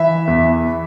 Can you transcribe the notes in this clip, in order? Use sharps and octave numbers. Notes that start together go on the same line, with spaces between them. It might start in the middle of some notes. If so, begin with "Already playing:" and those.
Already playing: E3 E5
E2